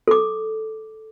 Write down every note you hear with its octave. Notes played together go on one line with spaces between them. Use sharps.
A4 D6